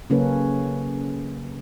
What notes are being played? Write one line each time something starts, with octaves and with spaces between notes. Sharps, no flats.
C#3 F#3 A#3 C#4 A4 B4